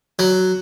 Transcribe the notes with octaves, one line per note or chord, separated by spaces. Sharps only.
F#3